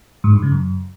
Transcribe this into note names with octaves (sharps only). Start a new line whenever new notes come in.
G#2
G2
C#3
F#2